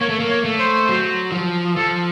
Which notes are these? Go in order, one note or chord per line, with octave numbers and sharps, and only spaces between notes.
A#3 C#5
A3
A#3
C#5
A3
C5
F#3
F3
F3 A4